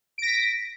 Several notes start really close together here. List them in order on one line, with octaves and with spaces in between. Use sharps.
D7 A#6 B6